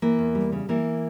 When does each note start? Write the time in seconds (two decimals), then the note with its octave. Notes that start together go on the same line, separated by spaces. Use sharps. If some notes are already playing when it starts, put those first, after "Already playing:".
0.02 E3 A#3
0.19 E2
0.35 G3
0.52 C#3
0.69 E3 A#3